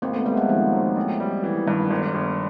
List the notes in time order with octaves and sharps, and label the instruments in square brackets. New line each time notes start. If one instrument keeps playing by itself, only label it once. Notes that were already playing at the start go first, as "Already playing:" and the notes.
[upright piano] G#1 [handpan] A#3 C4
[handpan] A3 B3
[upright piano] G3 [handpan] A3 B3
[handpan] G#3 A#3
[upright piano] D#3 [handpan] F3
[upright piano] F#2
A1
G3
E3
[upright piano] G2 [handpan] D#3
[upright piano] G1
G1